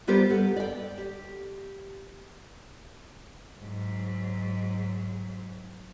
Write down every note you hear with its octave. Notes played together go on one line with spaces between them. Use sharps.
G3 B3 F4 G4 A#4 C5
B3 A4 F#5
D5 G5
G4
G#2 F#3